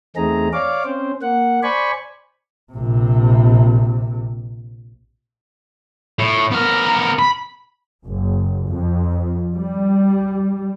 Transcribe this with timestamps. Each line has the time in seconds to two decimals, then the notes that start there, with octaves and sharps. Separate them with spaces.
0.16 E2 A3 C4 D#4 G#4 A#5
0.53 C#5 D5 F5 D6
0.84 C4 C#4 C5
1.22 A#3 F#5
1.63 C5 D5 G#5 B5 C#6
2.73 A#1 C3
6.19 A2
6.52 B3 A#4
7.19 B5
8.05 F#1
8.67 F2
9.55 G3